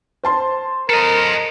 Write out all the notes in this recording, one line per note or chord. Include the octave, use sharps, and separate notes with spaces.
C5 A5 C6
A4 A#4 D#5